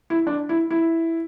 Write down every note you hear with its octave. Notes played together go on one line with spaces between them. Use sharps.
E4
D4
E4
E4